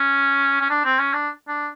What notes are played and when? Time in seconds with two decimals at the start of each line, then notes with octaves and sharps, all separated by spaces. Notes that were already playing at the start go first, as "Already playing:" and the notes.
Already playing: C#4
0.61 C#4
0.70 D4
0.85 C4
0.99 C#4
1.13 D4
1.48 D4